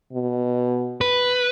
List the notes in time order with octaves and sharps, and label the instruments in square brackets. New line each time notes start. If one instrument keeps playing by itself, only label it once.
[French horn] B2
[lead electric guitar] B4